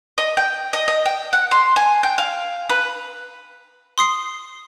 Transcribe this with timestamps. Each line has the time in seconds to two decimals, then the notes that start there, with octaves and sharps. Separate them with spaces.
0.18 D#5
0.37 G5
0.73 D#5
0.88 D#5
1.06 G5
1.33 F#5
1.51 C6
1.76 G#5
2.03 G5
2.18 F5
2.69 B4
3.98 C6 D#6 C7